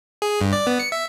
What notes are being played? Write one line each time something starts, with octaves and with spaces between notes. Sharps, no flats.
G#4
G2
D5
B3
C#7
E5